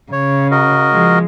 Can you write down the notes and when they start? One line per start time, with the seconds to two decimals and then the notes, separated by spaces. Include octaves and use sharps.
0.12 C#3 C#5
0.51 F#4 A#4 D#5
0.92 F3 G#3